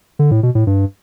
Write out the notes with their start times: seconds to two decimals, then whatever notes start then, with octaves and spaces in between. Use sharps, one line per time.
0.19 D3
0.31 A2
0.43 B2
0.55 A2
0.67 G2